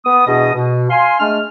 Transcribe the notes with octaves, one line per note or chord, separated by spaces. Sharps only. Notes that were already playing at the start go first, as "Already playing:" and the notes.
B3 D#6
E2 B2 B3 D4 D#5 D#6
B2
F5 G#5 C6
G#3 A3 D4 F6